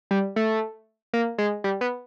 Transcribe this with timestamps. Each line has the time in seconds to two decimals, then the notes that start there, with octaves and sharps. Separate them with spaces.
0.11 G3
0.36 A3
1.13 A#3
1.38 G#3
1.64 G3
1.81 B3